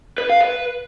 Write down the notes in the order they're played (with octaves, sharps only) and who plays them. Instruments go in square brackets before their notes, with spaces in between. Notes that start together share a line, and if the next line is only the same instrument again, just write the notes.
[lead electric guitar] B4
F5
B4